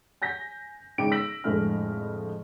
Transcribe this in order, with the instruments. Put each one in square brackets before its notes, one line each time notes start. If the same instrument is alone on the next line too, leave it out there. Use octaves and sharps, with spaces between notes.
[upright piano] G#5 G6 A#6 B6
G#1 C#3 D#4 G5 D6 D7
E6 A#6 B6 F#7
F2 A2 D3 G#3 E4 F6